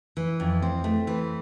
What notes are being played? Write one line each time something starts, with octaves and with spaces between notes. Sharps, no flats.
E3
F2
C4
A3
E3